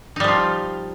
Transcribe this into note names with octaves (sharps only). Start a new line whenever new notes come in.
F3 G3 D#4 F4